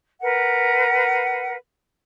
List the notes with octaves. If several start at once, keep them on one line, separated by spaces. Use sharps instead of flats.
A#4 B4 F#5